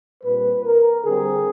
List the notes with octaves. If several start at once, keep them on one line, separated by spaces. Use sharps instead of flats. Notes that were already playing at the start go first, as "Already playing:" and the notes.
A#2 G3 C4 B4
A#4
D3 G3 C4 G#4